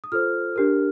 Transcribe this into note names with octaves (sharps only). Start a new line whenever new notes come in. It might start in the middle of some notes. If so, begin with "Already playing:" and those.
D#6
F4 A4 C5 F6
D4 G4 A#4